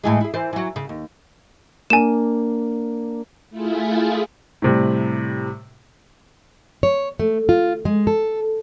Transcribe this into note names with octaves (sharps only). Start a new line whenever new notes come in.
A2 E3 G#3
E4 G#4
E3 C5 D5
E3 F#3
C#3
D#2
A#3 D4 G#5 E7
A3 E4 F4 G#4
A2 C3 G3
C#5
A3
F4
G#3
A4